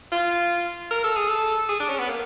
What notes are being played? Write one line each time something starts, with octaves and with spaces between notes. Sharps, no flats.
F4
A#4
A4
G#4
A4
G#4
D4
C#4
B3
A#3